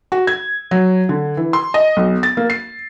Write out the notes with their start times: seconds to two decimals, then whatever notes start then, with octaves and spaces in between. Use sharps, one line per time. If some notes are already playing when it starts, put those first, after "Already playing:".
0.12 F#4
0.27 G#6
0.71 F#3
1.09 D3
1.37 E3
1.53 C6
1.74 D#5
1.97 B1
2.23 A6
2.37 A#3
2.50 C7